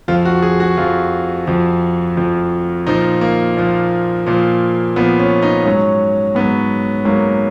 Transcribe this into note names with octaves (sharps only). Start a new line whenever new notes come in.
F2 F3 F4
F#4
G#4
F#4
F2 F3 F4
F2 F3
F2 F3
A#2 F3 D#4
A#3
A#2 F3
A#2 F3
A#2 F3 B3
C#4
D#4
G#2 F#3 C#4
G#2 F#3 B3
G#2 F#3 A#3